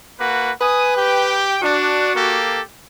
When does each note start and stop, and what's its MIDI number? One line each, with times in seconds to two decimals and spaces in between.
0.19 0.51 58
0.19 0.51 66
0.19 0.51 71
0.61 1.49 71
0.61 0.94 80
0.61 0.94 87
0.97 1.58 67
0.97 1.58 79
1.62 2.15 62
1.62 2.39 66
2.15 2.62 58
2.15 2.62 67
2.15 2.62 69